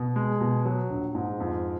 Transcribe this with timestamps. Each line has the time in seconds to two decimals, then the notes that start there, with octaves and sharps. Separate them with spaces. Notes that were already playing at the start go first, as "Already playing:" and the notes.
Already playing: B2
0.16 G#3
0.41 B2
0.65 F#3
0.90 A#1
1.15 G#2
1.40 F2